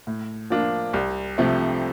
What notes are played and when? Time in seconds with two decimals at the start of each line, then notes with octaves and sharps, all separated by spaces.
0.07 A2
0.50 F3 A#3 D4 F4
0.93 C2
1.38 C3 F3 A3